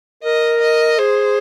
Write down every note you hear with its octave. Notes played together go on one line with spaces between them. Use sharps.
A#4 D#5
D#5
G#4 C5